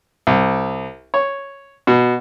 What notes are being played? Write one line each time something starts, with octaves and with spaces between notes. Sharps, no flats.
C2
C#5
B2